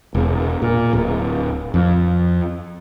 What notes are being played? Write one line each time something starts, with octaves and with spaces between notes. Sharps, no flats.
E1
A#2
D1
F2